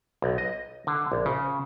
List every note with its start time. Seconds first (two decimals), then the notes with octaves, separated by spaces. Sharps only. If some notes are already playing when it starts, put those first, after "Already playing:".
0.22 B1
0.38 D#5
0.87 D3
1.12 A#1
1.26 C#3